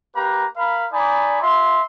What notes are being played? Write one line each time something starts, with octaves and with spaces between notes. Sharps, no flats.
A#3 G4 B4 A#5
A#4 F5 B5
D#4 D5 G#5 B5
F4 E5 C6